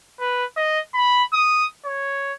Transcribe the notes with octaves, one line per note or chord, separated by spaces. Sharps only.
B4
D#5
B5
D#6
C#5